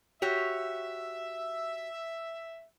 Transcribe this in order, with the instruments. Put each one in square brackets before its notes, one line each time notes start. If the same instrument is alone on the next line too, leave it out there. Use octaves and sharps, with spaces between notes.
[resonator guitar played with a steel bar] F#4 G4 C#5 [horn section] E5